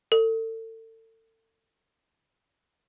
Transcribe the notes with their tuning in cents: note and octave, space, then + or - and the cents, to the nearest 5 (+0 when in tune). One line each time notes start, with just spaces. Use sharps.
A4 +35